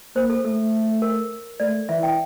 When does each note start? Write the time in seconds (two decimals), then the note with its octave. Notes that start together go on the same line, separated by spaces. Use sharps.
0.16 A#3 C5
0.30 A4
0.45 A3 A4
1.02 A#4
1.60 A3 D5
1.89 E3 E5
2.03 G5